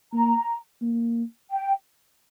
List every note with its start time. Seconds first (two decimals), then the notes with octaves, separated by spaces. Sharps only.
0.13 A#3 A#5
0.82 A#3
1.51 G5